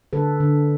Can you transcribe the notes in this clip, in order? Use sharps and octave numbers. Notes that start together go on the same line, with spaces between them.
D3 A4 B4
D3